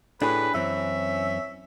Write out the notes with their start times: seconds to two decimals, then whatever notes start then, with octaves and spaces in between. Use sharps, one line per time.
0.22 A2 D4 G4 G#4 B4
0.55 F#2 E3 C4 C#4 E5